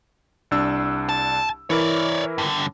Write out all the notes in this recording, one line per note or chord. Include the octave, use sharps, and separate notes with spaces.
C2 D4 E6
A5
E3 E4 A#4 C#5 D5
G2 D3